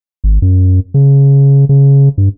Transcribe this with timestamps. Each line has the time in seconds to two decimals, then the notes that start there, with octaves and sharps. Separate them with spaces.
0.24 G#1
0.42 F#2
0.94 C#3
1.69 C#3
2.18 G2